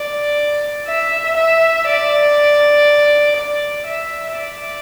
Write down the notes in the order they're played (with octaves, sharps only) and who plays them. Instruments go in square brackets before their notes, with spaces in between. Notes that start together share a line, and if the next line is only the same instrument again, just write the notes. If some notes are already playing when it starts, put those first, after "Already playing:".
Already playing: [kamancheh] D5
E5
E5
D5
D5
E5
D5